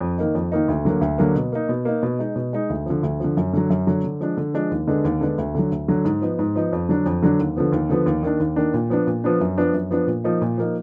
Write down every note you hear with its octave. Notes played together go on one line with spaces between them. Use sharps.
F2
D#3 A#3 D#4
F2
D#3 A#3 D#4
D2
D3 F#3 A#3
D2
D3 F#3 A#3
B2
A#3 D#4
B2
A#3 D#4
B2
G#3 D#4
B2
G#3 D#4
D2
D3 F3
D2
D3 F3
F#2
D3 F#3
F#2
D3 F#3
D3
F3 G#3 D4
D3
F3 G#3 D4
D#2
D3 G#3 B3 D4
D#2
D3 G#3 B3 D4
D2
D3 F#3
D2
D3 F#3
G#2
F3 B3 D#4
G#2
F3 B3 D#4
F2
D3 F#3 D4
F2
D3 F#3 D4
D#2
D3 F3 B3
D#2
D3 F3 B3
D#2
D#3 A#3 D4
D#2
D#3 A#3 D4
A#2
F3 B3 D4
A#2
F3 B3 D4
F#2
F3 B3 D4
F#2
F3 B3 D4
A#2
F3 A#3 D#4
A#2
F3 A#3 D#4